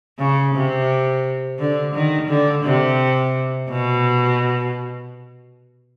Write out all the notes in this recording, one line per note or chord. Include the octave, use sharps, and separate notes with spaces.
C#3
C3
D3
D#3
D3
C3
B2